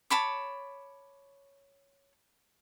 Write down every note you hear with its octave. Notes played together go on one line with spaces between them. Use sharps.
C#5 A5 B5 D6